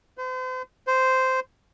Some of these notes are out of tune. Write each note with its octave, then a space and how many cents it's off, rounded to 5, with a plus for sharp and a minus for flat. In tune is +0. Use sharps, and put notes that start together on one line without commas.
C5 -40
C5 -10